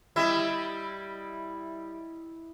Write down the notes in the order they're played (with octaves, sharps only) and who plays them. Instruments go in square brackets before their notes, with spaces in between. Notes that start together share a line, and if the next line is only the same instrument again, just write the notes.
[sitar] G3 E5 [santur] E4 D#5